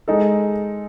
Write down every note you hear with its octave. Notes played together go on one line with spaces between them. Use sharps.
G#3 D#4 A4